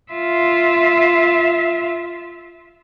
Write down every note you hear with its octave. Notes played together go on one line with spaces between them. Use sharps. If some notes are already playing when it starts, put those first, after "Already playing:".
F4 E5